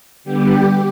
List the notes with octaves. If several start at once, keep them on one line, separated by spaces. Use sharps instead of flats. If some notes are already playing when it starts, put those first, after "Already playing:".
D3 G3 B3 G4